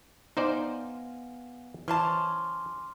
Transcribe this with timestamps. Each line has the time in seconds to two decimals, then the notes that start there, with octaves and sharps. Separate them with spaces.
0.37 B3 D#4 C5 D5 F5 G#5
1.88 E3 C#4 C5 A5 C6 D6 F6